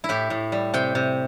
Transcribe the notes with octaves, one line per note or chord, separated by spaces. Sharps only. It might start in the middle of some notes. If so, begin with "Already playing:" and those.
E4
A2 G4
A2
G3
C3 G5
C3